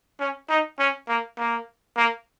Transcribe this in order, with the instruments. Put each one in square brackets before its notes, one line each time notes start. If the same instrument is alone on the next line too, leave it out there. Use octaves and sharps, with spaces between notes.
[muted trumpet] C#4
D#4
C#4
A#3
A#3
A#3